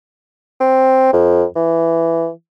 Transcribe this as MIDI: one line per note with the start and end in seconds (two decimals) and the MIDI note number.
0.61 1.10 60
1.13 1.44 41
1.56 2.29 52